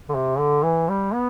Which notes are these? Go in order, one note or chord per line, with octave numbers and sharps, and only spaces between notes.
D3
C3
D3
E3
G3
B3